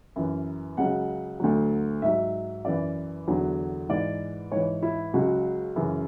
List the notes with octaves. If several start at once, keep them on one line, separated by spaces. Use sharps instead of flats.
F#2 E3
C#2 C#3 F#3 F#5
D2 D3 F#3
G#2 F#3 E5
F#2 E3 D5
E2 D3 F#3
G#2 E3 D5
G#2 E3 C#5
E4
C#2 C#3 F#3 F#4
F#2 C#3 E3